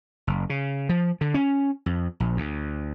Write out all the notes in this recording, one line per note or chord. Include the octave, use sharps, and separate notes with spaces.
F#1
C#3
F3
D3
C#4
F2
A#1
D2